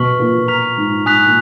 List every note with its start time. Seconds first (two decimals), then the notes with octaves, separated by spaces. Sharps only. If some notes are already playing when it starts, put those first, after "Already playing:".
Already playing: B2 C#6 F6 B6 F#7
0.19 A#2
0.48 A#5 F6 B6 F7
0.77 G#2
1.06 G#2 G#5 D#6 F#6 B6 F7
1.26 A#2